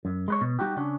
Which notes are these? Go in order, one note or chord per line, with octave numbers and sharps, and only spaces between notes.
F#2
G#3 B4 C#5
B2
G3 D#4 F#4 G4
C#3 C#4 D4